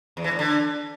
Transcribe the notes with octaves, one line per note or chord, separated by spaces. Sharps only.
E2
E3
A2
D3